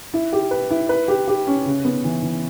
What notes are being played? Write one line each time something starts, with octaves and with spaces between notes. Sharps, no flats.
E4
G4
B4
E4
B4
G4
G4
C#4
C#3
B3
E3
E3